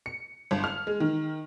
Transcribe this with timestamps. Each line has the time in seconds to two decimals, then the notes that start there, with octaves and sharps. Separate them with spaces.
0.06 C#7
0.51 G1
0.64 F6
0.87 G#3
1.00 D#3